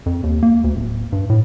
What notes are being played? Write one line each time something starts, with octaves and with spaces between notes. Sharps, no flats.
F2
D#2
A#3
D2
D1
G2
A2